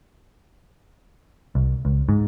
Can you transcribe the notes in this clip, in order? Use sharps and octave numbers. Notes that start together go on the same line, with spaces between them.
C2
C#2
G#2